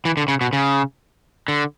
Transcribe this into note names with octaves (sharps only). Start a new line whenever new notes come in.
E3
D3
C#3
B2
C#3
D3